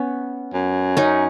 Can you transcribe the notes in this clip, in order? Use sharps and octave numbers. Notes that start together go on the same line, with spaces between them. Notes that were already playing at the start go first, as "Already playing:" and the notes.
Already playing: B3 C#4
F#2
C#4 D#4